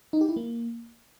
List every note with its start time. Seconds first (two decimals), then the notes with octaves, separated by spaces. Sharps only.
0.13 D#4
0.21 G4
0.29 E4
0.36 A#3